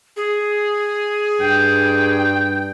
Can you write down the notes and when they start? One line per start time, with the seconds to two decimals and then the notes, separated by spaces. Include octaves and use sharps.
0.17 G#4
1.41 G2 G5